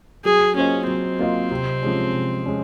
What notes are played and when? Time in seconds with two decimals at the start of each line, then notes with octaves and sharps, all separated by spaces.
0.25 F#3 G#4
0.56 A#3 C#4 F4 C5 D#5
0.87 F#3 C4
1.19 A#3 F4 C5 D#5
1.51 C3
1.82 F3 G#3 C#4
2.14 C3
2.45 G#3 C#4